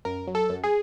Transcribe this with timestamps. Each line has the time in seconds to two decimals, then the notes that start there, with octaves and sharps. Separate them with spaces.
0.05 F#2 A#4
0.27 F#3
0.35 A4
0.49 F#2
0.64 G#4